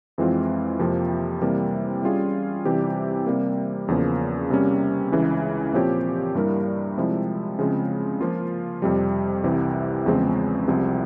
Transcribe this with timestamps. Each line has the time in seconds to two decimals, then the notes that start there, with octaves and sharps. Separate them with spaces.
0.18 F2 E3 G#3 C4 F4
0.79 F2 C3 F3 A#3
1.41 C3 E3 G3 A#3
2.03 G3 C#4 F4 G#4
2.65 C3 E3 G3 C4 G4
3.27 C3 G3 A#3
3.88 E2 C#3 F3 A#3
4.50 C3 G3 A#3 C#4
5.12 C#2 C#3 E3
5.73 A#2 F3 C4 G4 C#5
6.35 G2 G3 A#3 E4 A#4
6.98 C3 F3 G#3 E4
7.59 C#3 F3 G#3 C4
8.20 F3 A#3 F4
8.82 F2 C3 G3
9.44 C2 C3 E3
10.06 E2 C#3 F3 G#3 C4
10.68 C2 C3 F3